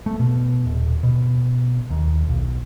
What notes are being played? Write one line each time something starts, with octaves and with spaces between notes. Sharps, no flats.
A3
B2
D#1
B2
D#2
B1